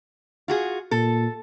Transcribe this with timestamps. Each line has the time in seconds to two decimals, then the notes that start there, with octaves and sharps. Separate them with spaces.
0.48 F4 F#4 G#4
0.91 A#2 A4